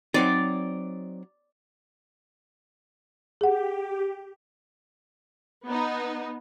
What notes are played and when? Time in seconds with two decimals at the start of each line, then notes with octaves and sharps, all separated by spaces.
0.14 F#3 C4 D#4 D5
3.41 G4 G#4 F#5
5.66 B3 D#4